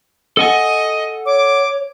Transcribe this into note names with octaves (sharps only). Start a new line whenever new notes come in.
A4 D#5 F#5 G#5
C#5 D6